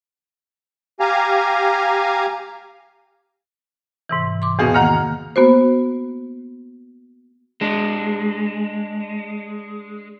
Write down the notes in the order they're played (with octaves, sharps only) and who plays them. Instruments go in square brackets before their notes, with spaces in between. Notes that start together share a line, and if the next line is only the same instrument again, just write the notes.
[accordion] G4 F5 G#5 A#5
[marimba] G#2 C3 E3
C6 D6
[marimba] E2 [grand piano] B2 G#4 F5
[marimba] D#3 A#3 [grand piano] F#5 A#5 F6
[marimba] A#3 B3 F#4 C5
[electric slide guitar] G#3 D4